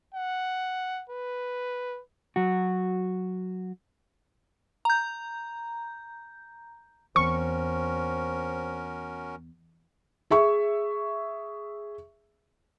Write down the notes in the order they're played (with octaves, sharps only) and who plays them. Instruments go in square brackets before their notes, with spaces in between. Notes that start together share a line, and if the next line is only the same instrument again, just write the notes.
[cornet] F#5
B4
[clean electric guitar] F#3 F#4
[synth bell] A#5 G6
[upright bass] E2 [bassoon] C4 [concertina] C#4 F#4 A#4 [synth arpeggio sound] C#6
[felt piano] G#4 E5 C#6